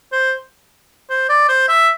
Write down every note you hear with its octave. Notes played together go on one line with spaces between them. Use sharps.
C5
C5
D5
C5
E5